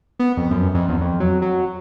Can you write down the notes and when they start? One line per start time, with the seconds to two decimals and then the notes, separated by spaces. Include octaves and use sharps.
0.19 B3
0.37 F2
0.51 F#2
0.74 F2
0.89 E2
1.01 F2
1.20 F#3
1.42 F#3